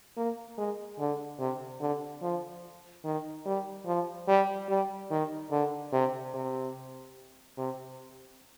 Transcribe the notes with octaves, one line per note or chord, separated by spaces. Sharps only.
A#3
G#3
D3
C3
D3
F3
D#3
G3
F3
G3
G3
D#3
D3
C3
C3
C3